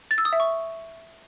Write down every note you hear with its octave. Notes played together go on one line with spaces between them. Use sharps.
A6
E6
D#6
E5
C#6